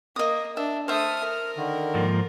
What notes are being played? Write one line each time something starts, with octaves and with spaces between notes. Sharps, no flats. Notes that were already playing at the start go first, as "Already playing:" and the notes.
A#3 D#5 D#6
D4 E5
A3 C5 E5 D#6 F6
A#4
D3 D#3
G#2 F3 A#3